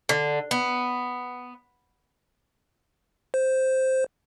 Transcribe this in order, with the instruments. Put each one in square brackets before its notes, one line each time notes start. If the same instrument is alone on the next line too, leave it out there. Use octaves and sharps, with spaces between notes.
[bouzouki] D3
B3
[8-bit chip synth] C5